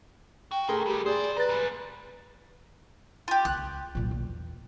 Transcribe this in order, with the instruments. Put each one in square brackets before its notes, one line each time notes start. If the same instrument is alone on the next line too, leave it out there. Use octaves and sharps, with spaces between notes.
[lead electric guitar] F#4 [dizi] G5
[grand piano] A3 G#4 A#4 [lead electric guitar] F#4 C6
[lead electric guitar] G#2 G3 [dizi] G4
[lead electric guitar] E2 C5 [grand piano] G#4 [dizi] D5
[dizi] B4 [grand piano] A#5 A6
[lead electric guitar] G3 G#3
[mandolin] F4 G4
[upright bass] C#2 [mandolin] F#6
[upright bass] B1 A#2
E2